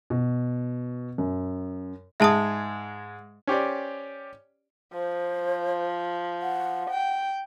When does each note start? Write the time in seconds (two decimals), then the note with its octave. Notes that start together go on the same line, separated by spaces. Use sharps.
0.10 B2
1.18 F#2
2.20 G#2 G#3 E5 A5 D#6
3.47 C#4 G4 C5 D5
4.93 F3 C5
6.42 F#5
6.90 G5